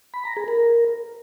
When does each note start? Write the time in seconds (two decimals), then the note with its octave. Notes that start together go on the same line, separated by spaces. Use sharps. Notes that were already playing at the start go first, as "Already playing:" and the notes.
0.14 B5
0.25 A#5
0.37 G#4
0.48 A#4